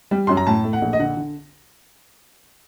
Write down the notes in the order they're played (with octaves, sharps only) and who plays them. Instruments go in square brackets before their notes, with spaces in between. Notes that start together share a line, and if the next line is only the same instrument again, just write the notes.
[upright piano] G3
F#2 C6
A#5
A2 A5
A3
F#5
A#1
D#5
D3 F#5
D3